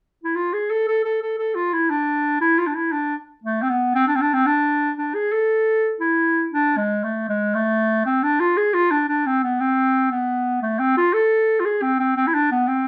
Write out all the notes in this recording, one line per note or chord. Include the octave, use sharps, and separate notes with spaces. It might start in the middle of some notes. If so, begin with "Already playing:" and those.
E4
F4
G#4
A4
A4
A4
A4
A4
F4
E4
D4
E4
F4
D4
E4
D4
A3
C4
B3
C4
D4
C4
D4
C4
D4
D4
G#4
A4
E4
D4
G#3
A3
G#3
A3
C4
D4
F4
G#4
F4
D4
D4
C4
B3
C4
B3
A3
C4
F4
A4
F4
G#4
C4
C4
C4
E4
D4
B3
C4